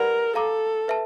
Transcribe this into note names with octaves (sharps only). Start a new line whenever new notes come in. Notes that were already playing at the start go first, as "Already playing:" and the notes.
Already playing: G4 A#4 B4 D5 F#5 B5
A4 F5 A#5 D6
B4 E5 A5